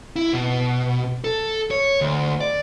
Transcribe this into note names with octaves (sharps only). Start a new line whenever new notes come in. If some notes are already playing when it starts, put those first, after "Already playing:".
E4
B2
A4
C#5
D2
D5